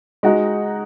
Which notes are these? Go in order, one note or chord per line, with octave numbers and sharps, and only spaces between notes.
G#3 D#4 F#4